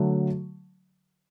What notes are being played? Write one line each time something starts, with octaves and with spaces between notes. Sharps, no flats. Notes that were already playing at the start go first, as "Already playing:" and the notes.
Already playing: D3 F#3 A3